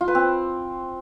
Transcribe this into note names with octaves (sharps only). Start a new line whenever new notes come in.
F4
B4
C4